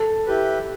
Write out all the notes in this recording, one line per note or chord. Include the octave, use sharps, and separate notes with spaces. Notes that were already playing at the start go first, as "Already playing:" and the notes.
Already playing: A4
E4 G4 B4